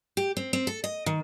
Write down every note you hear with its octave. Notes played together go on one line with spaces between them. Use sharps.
G4
C4
C4
A4
D#5
D#3